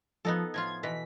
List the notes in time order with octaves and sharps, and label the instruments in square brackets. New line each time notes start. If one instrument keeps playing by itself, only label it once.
[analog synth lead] F3 [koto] B3 D#4 A4
[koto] A2 F3 F4 [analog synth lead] G#6
[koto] B2 E3 [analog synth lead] B6